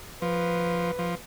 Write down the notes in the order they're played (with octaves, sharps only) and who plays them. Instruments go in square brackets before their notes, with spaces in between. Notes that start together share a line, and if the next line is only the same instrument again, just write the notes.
[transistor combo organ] F3 [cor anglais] B4
[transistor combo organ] F3